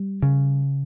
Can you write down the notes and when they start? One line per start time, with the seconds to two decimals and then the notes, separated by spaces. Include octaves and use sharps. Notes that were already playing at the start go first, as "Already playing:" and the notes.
Already playing: G3
0.22 C#3